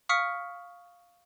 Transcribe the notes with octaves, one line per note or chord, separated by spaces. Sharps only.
F5 C#6 D#6 F6 B6 C#7